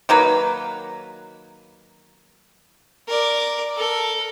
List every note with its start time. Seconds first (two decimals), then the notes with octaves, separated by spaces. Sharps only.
0.09 D#3 F#3 A#3 B4
3.08 A#4 D5
3.77 A4 A#4